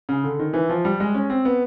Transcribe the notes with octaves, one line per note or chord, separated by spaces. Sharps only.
C#3
D3
D#3
E3
F3
G3
G#3
C#4
C4
B3